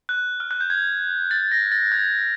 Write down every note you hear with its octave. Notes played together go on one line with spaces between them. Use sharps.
F#6
F6
F#6
G6
G#6
A6
A#6
A6
G#6